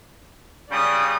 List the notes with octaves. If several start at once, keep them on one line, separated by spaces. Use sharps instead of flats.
C#3 G3 D5 D#6